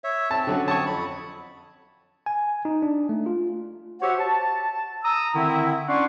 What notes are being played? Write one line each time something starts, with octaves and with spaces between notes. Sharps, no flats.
C#5 E5
C4 A5
D3 F#3 C#4
C4 C#5 A5 C#6 D#6
F2 B5
G#5
D#4
D4
A3
F4
F#4 G4 C5 C#5 E5 F#5
A5
A#5 D#6 E6
D3 D#3 C4 E4
C#4 D4 D5 F#5 C6 C#6